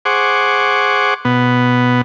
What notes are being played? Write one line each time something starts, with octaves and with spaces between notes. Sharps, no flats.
G#4 C5 F#5 C#6 D6
B2 B3